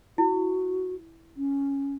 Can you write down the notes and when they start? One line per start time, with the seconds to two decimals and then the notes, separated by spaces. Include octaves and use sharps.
0.18 E4 F#4
1.37 C#4